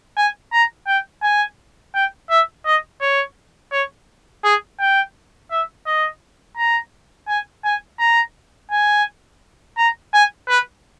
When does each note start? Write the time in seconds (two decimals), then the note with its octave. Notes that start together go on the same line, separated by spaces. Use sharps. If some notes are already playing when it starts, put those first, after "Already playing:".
0.17 G#5
0.52 A#5
0.87 G5
1.22 G#5
1.94 G5
2.30 E5
2.65 D#5
3.01 C#5
3.72 C#5
4.44 G#4
4.79 G5
5.51 E5
5.86 D#5
6.56 A#5
7.28 G#5
7.64 G#5
7.99 A#5
8.71 G#5
9.77 A#5
10.13 G#5
10.48 B4